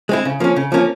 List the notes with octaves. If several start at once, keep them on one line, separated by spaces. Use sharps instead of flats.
G#3 C4 E4
C#3
F3 A#3 C#4
C#3
F3 A#3 C#4